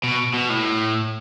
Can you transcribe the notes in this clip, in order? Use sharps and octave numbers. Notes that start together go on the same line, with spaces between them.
B2
B2
A2